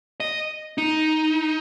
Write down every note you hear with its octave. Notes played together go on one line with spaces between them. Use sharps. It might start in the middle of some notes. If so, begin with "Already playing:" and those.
D#5
D#4